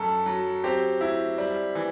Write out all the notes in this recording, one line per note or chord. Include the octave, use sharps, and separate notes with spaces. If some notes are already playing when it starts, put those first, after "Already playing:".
Already playing: F#2 A4
F#3
C4 G4
E4
G3
E3